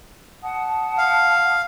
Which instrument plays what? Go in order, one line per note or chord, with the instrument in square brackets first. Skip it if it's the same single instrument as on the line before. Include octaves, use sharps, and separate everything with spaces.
[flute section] F#5 A5 D#6
[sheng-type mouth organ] F5